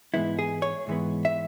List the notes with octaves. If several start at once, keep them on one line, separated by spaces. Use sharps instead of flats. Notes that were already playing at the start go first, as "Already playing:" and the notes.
G#2 E3 G#3 B3 E4
G#4
C#5
G#2 E3 G#3 B3
E5